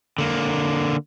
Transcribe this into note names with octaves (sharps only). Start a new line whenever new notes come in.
D3 A#3